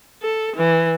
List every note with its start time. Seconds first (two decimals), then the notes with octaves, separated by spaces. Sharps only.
0.22 A4
0.56 E3